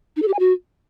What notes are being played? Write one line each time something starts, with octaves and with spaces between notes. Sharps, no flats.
D#4
A4
G4
G#5
F#4